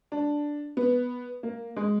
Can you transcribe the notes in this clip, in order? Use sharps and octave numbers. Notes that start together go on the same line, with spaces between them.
D4
B3
A#3
G#3